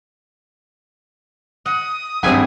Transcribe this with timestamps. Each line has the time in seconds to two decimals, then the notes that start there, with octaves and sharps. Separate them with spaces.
1.66 F#5 D#6
2.23 G#1 G2 C4 E4 G#4 F#5 G#5